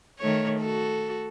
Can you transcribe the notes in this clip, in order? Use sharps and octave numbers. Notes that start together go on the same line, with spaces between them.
D#3 A3 C#5
F#4 A4